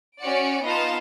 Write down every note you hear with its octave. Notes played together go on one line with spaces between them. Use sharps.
C#4 F#4 C#5 D5 C#7 D7
B3 D#4 F4 D#5 F5 A5